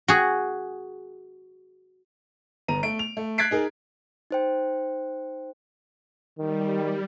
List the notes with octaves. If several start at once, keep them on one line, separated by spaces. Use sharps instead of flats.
F#4 G#4
G1 B3 A#5 D#7
A3 D7
F7
A3
F#6 G#6 A6 B6 C7 D7
D#4 G#4 A#4
D#4 C5 G5
D#3 G3